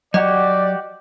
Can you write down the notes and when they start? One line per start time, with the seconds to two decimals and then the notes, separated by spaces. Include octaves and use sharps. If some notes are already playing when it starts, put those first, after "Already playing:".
0.14 F#3 F#4 G4 D5 D#5 F#5